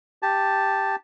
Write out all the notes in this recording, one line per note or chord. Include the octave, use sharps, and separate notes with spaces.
G4 A5